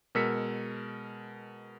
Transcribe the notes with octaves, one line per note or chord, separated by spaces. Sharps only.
B2 G#3 A#4 E6 B6 C#7